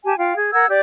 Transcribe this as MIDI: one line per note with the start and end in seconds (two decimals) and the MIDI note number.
0.05 0.16 67
0.05 0.16 80
0.05 0.16 81
0.18 0.35 65
0.18 0.35 77
0.18 0.35 79
0.35 0.53 68
0.53 0.67 70
0.53 0.67 78
0.53 0.67 88
0.53 0.67 92
0.69 0.80 67
0.69 0.80 74
0.69 0.80 91